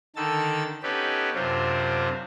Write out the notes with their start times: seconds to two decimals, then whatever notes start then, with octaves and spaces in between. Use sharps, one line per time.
0.16 D3 D#3 A4 E6 A6
0.83 B3 C#4 D#4 G4 A4 B4
1.34 F#2 C3 C4 D4 F4